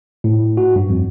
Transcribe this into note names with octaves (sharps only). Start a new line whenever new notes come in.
A2
F#4
G2
F2